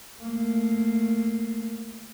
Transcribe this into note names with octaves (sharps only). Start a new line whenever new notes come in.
A3 A#3